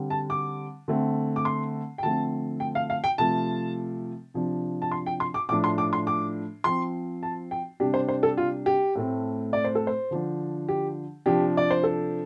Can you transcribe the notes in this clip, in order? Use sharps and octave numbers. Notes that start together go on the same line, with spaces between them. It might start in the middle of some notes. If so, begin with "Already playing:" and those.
Already playing: D3 G3 C4
A5
D6
D3 A3 C4
D6
C6
G5
D3 F3 A3 C4 A5
G5
F5
F5
G5
C3 F3 A3 A5
C3 F3 D4
A5
C6
G5
C6
D6
A2 F3 D4 D6
C6
D6
C6
D6
F3 C4 C6
A5
G5
C3 G3 D4 G4
C5
C5
A4
F4
G4
A2 A3 C4
D5
C5
A4
C5
D3 F3 D4
G4
C3 F3 D4 G4
D5
C5
A4